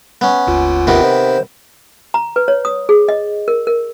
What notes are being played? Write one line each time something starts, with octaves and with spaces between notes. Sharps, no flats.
B3 C#4
G1 D#2 F4
C3 D#3 B3
C5
A#5
B4
C#5
D#6
G#4
D#5
A#4
A#4